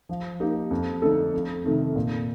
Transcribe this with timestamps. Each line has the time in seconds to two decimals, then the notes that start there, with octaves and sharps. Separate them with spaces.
0.09 F3
0.40 A#3 D#4 G4
0.71 F2
1.02 D3 A3 D#4 A4
1.34 F2
1.64 C3 D#3 A3 D#4
1.96 A#2